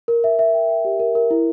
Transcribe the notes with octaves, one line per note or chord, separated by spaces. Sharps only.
A#4
E5
E5
G5
G5
G4
A#4
A#4
E4